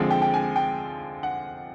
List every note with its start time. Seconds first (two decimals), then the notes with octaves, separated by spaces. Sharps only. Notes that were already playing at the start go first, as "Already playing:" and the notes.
Already playing: D3 F3 G#3 C4
0.11 G5
0.22 G5
0.34 G#5
0.56 G5
1.23 F#5